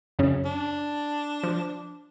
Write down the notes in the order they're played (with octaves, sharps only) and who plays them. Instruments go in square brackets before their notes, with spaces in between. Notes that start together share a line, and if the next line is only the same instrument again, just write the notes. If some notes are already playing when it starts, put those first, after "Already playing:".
[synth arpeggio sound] F#2 C#3 C#4
[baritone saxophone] D4
[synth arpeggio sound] F3